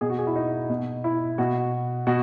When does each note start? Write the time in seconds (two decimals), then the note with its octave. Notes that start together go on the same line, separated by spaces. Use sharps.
0.01 B2 G#4
0.10 F#4
0.18 G#4
0.27 E4
0.36 D#4
0.70 B2
1.04 E4
1.38 B2 F#4
2.07 B2 F#4